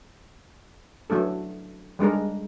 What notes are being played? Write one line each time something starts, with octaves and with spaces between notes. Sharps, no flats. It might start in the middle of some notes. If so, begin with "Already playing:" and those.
F#3 A3 D4 A4
G3 G#3 D4 A#4